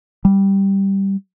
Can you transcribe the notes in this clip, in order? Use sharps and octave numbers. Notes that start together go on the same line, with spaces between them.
G3